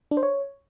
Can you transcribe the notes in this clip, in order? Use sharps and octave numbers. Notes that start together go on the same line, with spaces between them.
D4
C5
C#5